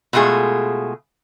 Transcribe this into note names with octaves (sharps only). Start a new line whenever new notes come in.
B2 G#3 A3 F4 G#4